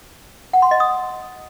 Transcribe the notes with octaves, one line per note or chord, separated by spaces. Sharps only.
F#5
C6
D#5
D#6